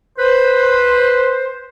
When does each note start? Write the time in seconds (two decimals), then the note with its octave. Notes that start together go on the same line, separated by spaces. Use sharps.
0.19 B4 C5